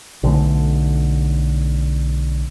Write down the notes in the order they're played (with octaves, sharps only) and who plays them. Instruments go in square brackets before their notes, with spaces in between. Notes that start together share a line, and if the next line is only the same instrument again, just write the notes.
[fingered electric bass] B1 D3 A3